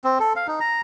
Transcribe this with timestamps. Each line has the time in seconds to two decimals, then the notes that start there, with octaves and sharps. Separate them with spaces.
0.04 C4
0.20 A4
0.36 F5
0.47 D#4
0.60 A#5